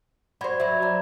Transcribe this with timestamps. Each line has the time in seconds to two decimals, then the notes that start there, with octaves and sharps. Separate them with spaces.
0.41 F#4 C5 D5 B5 G#6
0.60 F#3 E5 G#6
0.82 D5 A#5